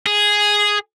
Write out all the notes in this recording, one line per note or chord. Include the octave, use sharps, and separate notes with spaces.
G#4